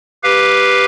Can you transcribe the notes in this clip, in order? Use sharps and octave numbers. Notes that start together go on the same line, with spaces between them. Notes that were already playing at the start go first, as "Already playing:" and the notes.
G4 B4 F5